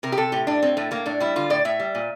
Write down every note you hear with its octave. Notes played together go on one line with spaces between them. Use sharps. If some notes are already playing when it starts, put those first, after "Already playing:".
C3 A#4
G4
C3 A4
A2 G4
A2 D4
A2 C4
A2 A3
A2 A#3
A2 D4
G3 E4
D3 F4
A2 D5
A2 E5
G3
A#2